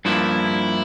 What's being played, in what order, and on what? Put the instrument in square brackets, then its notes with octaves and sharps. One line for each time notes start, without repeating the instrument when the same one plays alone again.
[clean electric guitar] G2 F3 A#3 [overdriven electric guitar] E4